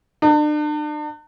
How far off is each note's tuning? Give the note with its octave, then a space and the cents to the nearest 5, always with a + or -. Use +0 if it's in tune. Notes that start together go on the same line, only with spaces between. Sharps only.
D4 +40